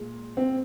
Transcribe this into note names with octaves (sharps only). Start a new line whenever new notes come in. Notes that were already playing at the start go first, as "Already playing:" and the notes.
Already playing: A#2 G#3
C4